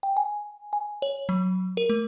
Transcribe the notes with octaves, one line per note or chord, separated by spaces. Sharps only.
G5
G#5
G#5
C#5
F#3
A#4
A3